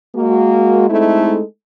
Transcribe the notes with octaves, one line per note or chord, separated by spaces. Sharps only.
G#3 A#3 F#4
G#3 A3 C4 D#4 E4 A4